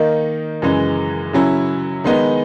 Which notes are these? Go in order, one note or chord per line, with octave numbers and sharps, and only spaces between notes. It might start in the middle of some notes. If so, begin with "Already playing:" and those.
Already playing: D#3 A#3 D#4
F#2 C#3 E3 G#3
C#3 F#3 C#4 E4
D#3 G#3 B3 D#4